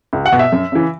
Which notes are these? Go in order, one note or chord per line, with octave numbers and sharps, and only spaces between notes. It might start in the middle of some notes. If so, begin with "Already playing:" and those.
C#2
F#5
B2
E5
F#2
C#3 E3